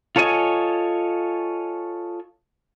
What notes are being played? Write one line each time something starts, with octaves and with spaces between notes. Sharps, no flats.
F4 A4 C#5 D#5 G#5